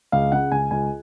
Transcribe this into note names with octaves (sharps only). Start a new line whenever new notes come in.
C#2 F5
C#3 F#5
C#2 G#5
C#2 G#5